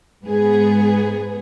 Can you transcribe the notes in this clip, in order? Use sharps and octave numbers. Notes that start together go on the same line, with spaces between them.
G#2 B3 G#4